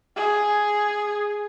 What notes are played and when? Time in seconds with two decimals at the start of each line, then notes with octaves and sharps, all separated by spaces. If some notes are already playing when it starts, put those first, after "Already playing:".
0.16 G#4